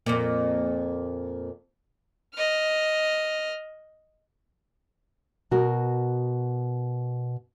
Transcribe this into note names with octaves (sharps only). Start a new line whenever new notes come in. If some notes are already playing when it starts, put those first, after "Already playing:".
F2 A#2
D#5 F6
B2 F#4 A#4